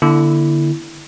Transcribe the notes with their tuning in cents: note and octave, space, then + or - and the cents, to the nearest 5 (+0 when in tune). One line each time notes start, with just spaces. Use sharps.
D3 +0 A#3 +40 E4 +0